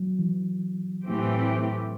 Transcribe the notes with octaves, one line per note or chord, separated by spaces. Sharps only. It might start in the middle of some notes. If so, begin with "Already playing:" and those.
Already playing: F#3
E3
A2 E3 A3 C4 G4